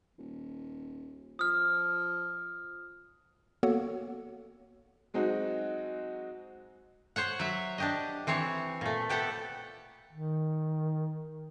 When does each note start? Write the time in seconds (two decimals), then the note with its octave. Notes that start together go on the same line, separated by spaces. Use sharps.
0.18 D#1
1.39 F3 D#6 F6
3.63 A#3 B3 F#4 A4 C#5 F#5
5.14 F#3 G#3 C4 D#4 F#4
7.16 C5 C#5 F#5
7.39 F#3 E5
7.78 D4 G4 D#5
8.27 E3 C4 C5 C#5
8.81 A#2 A3
9.09 B3 G4 A4 F#5
10.11 D#3